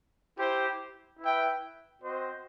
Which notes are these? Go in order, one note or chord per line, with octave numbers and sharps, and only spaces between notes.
E4 G4 C5
E4 B4 E5 G5
C4 F#4 C5 D#5